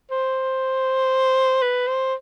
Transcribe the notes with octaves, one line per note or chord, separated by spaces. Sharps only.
C5
B4
C5